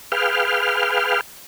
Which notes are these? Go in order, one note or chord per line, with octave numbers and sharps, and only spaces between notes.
G#4 B4 F5 G5 F6